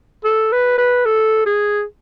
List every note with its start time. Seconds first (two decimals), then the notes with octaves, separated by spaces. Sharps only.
0.25 A4
0.52 B4
0.78 B4
1.06 A4
1.46 G#4